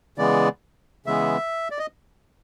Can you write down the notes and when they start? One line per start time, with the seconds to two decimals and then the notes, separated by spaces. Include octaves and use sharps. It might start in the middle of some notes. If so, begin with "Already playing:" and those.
0.18 C#3 E3 G#3 B3 D5
1.06 C#3 E3 G#3 B3 E5
1.71 D5
1.78 D#5